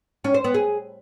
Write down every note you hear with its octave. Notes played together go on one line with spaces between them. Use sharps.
C#4
C5
B3
G#4